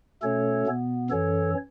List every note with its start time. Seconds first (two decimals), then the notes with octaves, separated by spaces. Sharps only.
0.22 B2 A3 C#4 A4 C#5
0.67 B2 B3
1.10 F#2 E3 C#4 A4 C#5